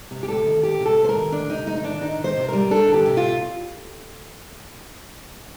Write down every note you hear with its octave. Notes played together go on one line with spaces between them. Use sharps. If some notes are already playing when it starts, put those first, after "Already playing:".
C3
G4
D2 A4
D#3
D2 G4
C3
A4
D2
C5
A#4
D#3
D2 D4
C3 D#4
D2 D#4
D#4
D#3 D4
D4 D#4
D#3
C5
C3
G3 A#4
D4 A4
D#3
G4
C3
F4